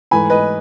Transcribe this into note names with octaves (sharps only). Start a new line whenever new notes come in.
G#2 E3 A3 G#5 B5
B4 D#5